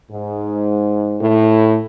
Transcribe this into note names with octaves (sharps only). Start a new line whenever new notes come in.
G#2
A2